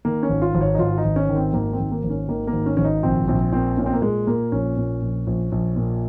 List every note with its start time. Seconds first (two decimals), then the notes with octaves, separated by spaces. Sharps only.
0.05 D#3 A#3
0.23 C#4
0.29 G#1
0.42 F4
0.55 G#1
0.61 C#5
0.74 D#4
0.79 G#1 F4
0.98 D#4
1.05 G#1
1.16 C#4
1.29 D#3
1.36 C4
1.54 G#1 A#3
1.73 C4
1.79 G#1
1.91 A#3
2.04 G#1
2.10 C#4
2.28 D#3 A#3
2.47 A#3
2.53 G#1
2.66 C#4
2.77 G#1 C#4
2.84 D#4
3.03 A#1 C4
3.28 A#1 C4
3.53 A#2 C4
3.77 A#2 C#4
3.86 C4
3.93 A#3
4.02 A#2 G#3
4.27 A#2 A#3
4.52 A#1 C#4
4.77 A#2
5.02 A#1
5.27 A#1
5.52 A#1
5.76 A#2